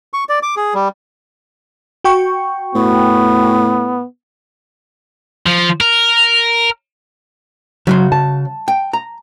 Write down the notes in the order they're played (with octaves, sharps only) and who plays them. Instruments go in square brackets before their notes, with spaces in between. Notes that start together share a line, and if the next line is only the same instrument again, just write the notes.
[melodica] C#6
D5
D6
G#4
G3
[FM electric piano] F#4 G5 C#6
[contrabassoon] A2 [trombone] B3
[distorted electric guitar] F3
A#4
[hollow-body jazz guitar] C#3 F#4 C6 [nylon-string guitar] F#3
[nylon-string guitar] A5
[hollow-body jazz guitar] G5
A#5